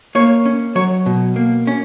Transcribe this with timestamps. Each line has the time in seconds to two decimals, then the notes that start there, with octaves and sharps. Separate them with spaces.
0.15 A#3 C#5
0.45 C#4
0.75 F#3 C#5
1.06 B2
1.36 A#3
1.67 C#4